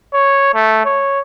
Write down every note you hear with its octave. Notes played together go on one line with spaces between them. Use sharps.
C#5
A3
C#5